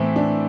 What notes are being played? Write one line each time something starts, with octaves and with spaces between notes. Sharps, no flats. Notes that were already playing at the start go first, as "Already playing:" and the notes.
Already playing: A2 E3 C4 C5 E5
D4